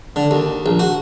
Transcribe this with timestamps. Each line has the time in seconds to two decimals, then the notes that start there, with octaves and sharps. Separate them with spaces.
0.16 D3
0.31 D#2
0.66 A#1
0.79 F#4